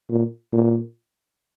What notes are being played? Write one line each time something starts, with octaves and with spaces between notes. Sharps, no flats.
A#2
A#2